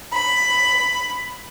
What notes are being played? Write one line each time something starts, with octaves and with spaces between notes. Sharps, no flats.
B5